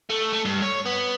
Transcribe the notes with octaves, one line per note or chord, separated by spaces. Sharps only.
A3
A3
G2
C#5
B3